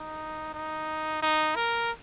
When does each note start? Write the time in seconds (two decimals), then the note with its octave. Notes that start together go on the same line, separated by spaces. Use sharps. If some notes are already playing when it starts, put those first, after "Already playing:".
Already playing: D#4
0.54 D#4
1.22 D#4
1.56 A#4